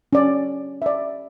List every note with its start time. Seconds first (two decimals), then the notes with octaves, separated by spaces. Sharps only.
0.13 C#4 D5
0.82 D5 E5